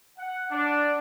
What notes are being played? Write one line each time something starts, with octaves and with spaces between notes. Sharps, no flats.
F#5
D4